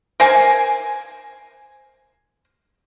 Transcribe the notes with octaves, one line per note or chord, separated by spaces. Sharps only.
A#4 C5 G#5